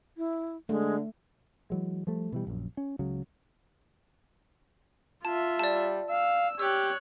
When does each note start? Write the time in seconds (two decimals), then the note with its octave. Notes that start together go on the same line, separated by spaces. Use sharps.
0.17 E4
0.69 D3 G#3 A3
1.70 E3 F#3 G#3
2.07 F3 G3 A3
2.32 B2 E3 G3
2.47 A#1 F#2
2.77 C#4
2.99 C#2 C#3 F#3
5.25 F4 E5 A5
5.59 G3 D5 A5
6.10 F5 E6
6.59 G4 C#5 E6 F#6